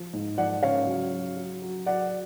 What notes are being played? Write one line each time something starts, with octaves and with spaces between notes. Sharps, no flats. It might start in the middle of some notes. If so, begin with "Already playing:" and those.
Already playing: F3
G#2
F3 D5 F#5
C#3 C#5 F5
F#3
F#3
F#3
F#3
F#3 D5 F#5